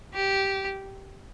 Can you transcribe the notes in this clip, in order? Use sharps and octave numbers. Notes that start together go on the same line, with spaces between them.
G4